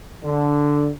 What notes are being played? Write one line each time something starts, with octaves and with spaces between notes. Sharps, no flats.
D3